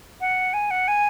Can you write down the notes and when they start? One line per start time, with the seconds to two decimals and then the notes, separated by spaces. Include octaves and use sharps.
0.21 F#5
0.54 G#5
0.71 F#5
0.88 G#5